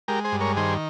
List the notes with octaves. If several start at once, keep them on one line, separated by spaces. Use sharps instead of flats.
G#3 G4 A#4
G#4 C5
G2
A#4 C#5
D#3 G#4 C5